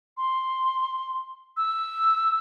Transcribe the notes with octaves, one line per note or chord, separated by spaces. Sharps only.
C6
E6